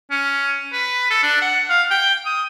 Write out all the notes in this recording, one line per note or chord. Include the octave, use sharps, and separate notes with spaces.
C#4
B4
A4
D4
F#5
F5
G5
D#6